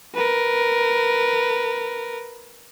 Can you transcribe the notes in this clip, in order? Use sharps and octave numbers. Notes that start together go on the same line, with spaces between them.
A#4 B4